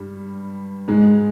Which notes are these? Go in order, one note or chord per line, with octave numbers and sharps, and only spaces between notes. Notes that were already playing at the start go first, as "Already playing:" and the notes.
Already playing: G2 G3
G#2 G#3